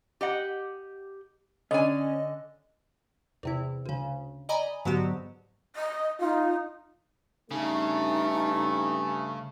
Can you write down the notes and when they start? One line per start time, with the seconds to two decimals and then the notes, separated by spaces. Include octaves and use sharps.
0.21 G4 D#5 F#5
1.71 D3 C#4 D#5 G#5
3.43 E2 C3 E4
3.86 D2 C#3
4.49 D5 D#5 G#5 A#5 B5
4.85 G#2 D3 F#3 B3 F#4 G4
5.75 D#5
6.20 D#4 F4
7.51 G2 C#3 A3 D#4